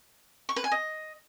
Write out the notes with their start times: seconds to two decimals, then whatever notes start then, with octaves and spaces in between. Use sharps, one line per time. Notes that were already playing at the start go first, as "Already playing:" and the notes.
0.49 C#6
0.56 B4
0.64 G#5
0.72 D#5